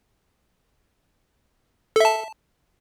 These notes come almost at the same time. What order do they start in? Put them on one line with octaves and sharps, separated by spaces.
A4 E5 A5